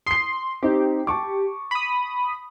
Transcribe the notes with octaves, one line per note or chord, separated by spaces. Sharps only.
C6 D#6 C7
C4 D#4 G4
A5 C#6 D6
B5 D#6